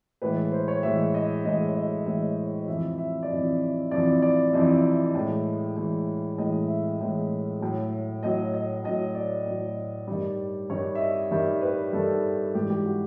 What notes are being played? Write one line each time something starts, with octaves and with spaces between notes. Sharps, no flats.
A2 E3 G#3 B4
C5
C#5
A2 E3 G#3 E5
D#5
A2 E3 G#3 D#5
D#5
A2 E3 G#3 E5
F2 C3 E3 E5
E5
D5
F2 C3 E3 D#5
F2 C3 E3 D5
D5
F2 C3 E3 D#5
A2 E3 G#3
A2 E3 G#3
A2 E3 G#3 D#5
E5
A2 E3 G#3
A2 F#3
A2 F#3 D#5
D#5
A2 F#3 D#5
D5
A2 F#3
G2 D#3 G3
G2 D#3 G3 C#5
E5
D#5
G2 D#3 G3 E5
B4
G2 D#3 G3 A4
G#2 E3 G3 G4
G4
F#4